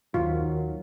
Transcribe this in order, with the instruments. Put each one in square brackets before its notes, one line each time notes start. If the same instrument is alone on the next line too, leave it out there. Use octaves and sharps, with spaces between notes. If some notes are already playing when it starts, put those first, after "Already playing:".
[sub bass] D#2 [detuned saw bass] D#3 [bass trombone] F#3 [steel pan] F4